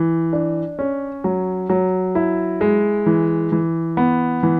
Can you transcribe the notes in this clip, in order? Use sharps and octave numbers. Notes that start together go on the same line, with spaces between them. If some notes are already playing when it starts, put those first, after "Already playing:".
Already playing: E3
D4
C#4
F#3
F#3
E4
G#3
E3
E3
B3
E3